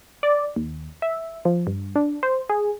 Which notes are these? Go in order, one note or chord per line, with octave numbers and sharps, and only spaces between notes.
D5
D#2
E5
F3
G2
D4
C5
G#4